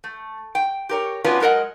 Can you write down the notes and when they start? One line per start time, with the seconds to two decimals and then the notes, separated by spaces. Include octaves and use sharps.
0.04 A3
0.55 G5
0.89 G4 A#4 C#5
1.24 B3 C#4 D4 F4 F#4 B4
1.40 F#3 G#3 A#4 D#5 F#5